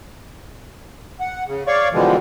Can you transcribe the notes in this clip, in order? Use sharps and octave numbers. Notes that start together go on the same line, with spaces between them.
F#5
C#3
C#5 D5 F5 C#6
B2 D3 E3 F3 G3 G#3